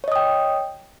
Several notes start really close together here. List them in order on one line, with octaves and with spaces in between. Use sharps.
C#5 D#5 D#6 G5